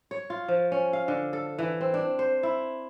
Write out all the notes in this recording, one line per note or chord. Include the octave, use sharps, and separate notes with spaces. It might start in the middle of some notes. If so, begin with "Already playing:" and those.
C#5
F4
F3
C#4
F5
D3
A4
E3
C4
D4
C5
E4